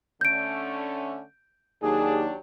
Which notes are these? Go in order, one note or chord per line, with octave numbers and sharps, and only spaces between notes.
D3 A3 C#4 G6 D7
D#2 F#3 D4 G4 G#4